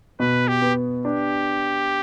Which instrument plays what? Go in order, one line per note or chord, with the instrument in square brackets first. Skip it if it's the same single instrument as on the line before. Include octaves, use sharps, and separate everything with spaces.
[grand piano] B2 [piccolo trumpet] B4
[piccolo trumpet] G4
[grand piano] B3
[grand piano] D4 [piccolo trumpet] G4